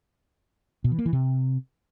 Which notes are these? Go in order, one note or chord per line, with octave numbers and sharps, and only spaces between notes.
B2
E3
A#3
E3
C3